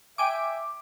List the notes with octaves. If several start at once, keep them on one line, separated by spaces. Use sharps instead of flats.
E5 G5 G#5 D6 D7